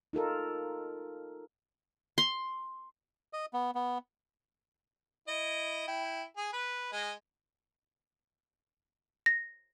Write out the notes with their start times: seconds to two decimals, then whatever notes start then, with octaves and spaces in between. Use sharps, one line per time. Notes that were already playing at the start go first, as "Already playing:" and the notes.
0.13 D#4 F4 A4 A#4
2.18 C6
3.33 D#5
3.53 B3
3.75 B3
5.28 E4 D#5
5.88 E4 G5
6.37 G#4
6.53 B4
6.92 G#3 D#5
9.26 A#6